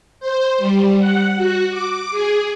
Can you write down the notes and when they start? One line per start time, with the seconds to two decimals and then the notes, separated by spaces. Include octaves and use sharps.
0.20 C5
0.58 G3
0.98 F#5
1.36 F#4
1.70 D6
2.10 G#4